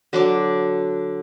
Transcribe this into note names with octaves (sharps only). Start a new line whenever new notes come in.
D3 F#3 D6